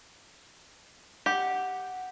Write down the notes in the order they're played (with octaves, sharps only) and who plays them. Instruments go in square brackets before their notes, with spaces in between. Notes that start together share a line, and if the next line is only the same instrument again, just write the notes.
[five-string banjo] G4 [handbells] F#5